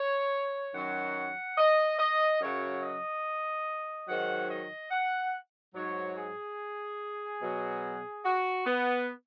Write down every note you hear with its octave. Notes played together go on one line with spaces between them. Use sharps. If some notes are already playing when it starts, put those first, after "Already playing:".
Already playing: C#5
F#2 D#3 F#3 F#5
D#5
D#5
F#2 C#3 F#3 C#5
D#5
G#2 D#3 F#3 F#5
D#5
F#5
G#2 F#3 C#5
G#4
B2 F#3
F#4
B3